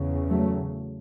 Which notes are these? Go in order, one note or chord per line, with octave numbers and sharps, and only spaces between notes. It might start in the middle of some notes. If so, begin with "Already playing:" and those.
Already playing: E2 C#3
F#3 A3